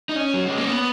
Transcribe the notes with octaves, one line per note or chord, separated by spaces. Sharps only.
D#4
C#4
F#3
G#3
A#3
B3